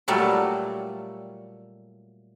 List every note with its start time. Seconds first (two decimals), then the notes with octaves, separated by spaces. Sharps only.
0.08 A#2 F#3 G3 A3 F#4